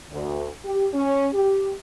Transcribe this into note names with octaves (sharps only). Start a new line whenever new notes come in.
D2
G4
C#4
G4